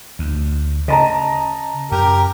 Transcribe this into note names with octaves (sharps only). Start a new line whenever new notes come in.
D2
C#3 D#5 A5 A#5
F#2 G4 A#4